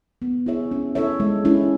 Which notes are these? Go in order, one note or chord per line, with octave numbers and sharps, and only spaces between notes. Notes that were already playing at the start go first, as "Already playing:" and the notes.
B3
E4 G#4 C#5 E5
C#4
E4 A4 C#5 E5
G#3
C#4 E4